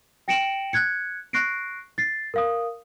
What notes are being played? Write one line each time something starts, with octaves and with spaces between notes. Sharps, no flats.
G5 A#6 C#7 D7 E7 F#7
F#6 G#6 C#7
C#6 F#6 A#6 C7 D7
A6 C7
A#4 F5 D#6